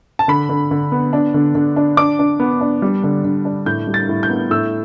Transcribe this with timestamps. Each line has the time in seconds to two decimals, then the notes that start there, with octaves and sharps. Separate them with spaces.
0.19 A5
0.28 D3 B5
0.49 D3
0.71 D3
0.92 B3
1.13 D4
1.34 D3
1.55 D3
1.76 D4
1.97 D4 D6
2.19 D4
2.40 B3
2.61 D4
2.82 G3
3.04 D3
3.25 D3
3.45 D4
3.66 A2 G6
3.87 G3
3.94 A6
4.09 A2
4.23 G6
4.29 B3
4.51 A2 E6